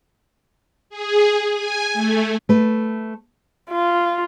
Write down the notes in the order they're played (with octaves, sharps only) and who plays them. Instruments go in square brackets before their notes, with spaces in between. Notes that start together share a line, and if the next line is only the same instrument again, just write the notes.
[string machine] G#4
G#5
A3
[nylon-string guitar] A3 B4
[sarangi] F4